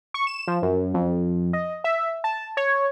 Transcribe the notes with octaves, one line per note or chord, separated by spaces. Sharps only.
C#6
E7
F3
F#2
F2
D#5
E5
A5
C#5